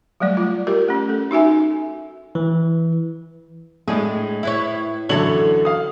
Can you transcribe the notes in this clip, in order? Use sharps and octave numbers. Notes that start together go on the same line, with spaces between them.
F#3 G3 A3 D5
F4
F4 G4 A#4
A3 C#4
A4
D#4 F#4 E5 G#5
E3
A2 G#3 D4 G#4
E4 B4 C#5
F#2 D3 E3 A4 C#5 F#7
F5 D#6